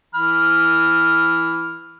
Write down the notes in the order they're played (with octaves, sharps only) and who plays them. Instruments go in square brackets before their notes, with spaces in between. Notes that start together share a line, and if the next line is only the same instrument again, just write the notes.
[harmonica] E3 B5 F6